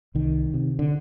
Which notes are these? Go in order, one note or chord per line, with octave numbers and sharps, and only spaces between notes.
C2 D#3
C3
D3